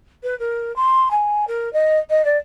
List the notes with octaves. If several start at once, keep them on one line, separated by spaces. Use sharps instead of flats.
B4
A#4
C6
G#5
A#4
D#5
D#5
D5